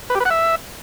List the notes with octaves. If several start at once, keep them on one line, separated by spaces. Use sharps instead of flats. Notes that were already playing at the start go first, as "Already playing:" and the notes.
B4
G4
B4
F#5
E5